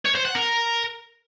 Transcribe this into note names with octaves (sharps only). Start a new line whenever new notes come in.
C#5
C5
F#5
A#4